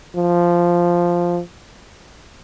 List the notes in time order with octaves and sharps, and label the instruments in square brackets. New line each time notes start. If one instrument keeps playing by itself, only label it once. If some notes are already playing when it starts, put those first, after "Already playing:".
[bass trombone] F3